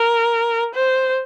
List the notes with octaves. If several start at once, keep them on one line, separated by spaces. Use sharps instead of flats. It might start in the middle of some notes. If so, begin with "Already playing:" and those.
Already playing: A#4
C5